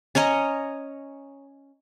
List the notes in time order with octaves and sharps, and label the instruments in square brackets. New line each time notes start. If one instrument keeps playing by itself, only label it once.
[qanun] C#4 C#5 D#5 A#5